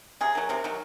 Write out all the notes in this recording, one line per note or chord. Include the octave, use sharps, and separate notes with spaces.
C3 G#4
D#3 F#3
C3 A#4
D#3 F#3